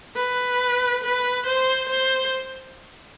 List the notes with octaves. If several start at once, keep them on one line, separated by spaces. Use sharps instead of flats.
B4
B4
C5
C5